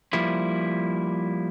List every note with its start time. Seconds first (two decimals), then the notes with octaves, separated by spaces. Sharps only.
0.13 F3 G3 A#3 E4